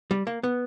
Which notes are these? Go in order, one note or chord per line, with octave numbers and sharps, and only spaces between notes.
G3
A#3
B3